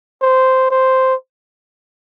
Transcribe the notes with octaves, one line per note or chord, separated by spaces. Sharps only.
C5
C5